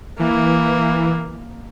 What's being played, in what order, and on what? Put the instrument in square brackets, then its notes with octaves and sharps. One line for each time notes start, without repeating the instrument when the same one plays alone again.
[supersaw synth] E3 [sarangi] A#3